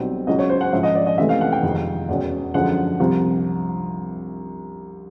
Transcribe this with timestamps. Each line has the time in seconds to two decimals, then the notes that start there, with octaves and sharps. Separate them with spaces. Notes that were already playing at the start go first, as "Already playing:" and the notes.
Already playing: B1 B2 G3 C4
0.27 C#2 C#3 F#3 D#5
0.39 C#5
0.50 C5
0.61 F#5
0.72 G#2 F3 G#3 C#4 E5
0.83 D#5
0.95 D5
1.07 D#5
1.18 C#2 C3 E3 A3 E5
1.29 F5
1.41 F#5
1.53 G5
1.63 F2 C3 D#3 G#3
2.09 E2 B2 G#3 C#4
2.54 F#2 D3 F3 G#3 F#5
3.00 C2 C3 F3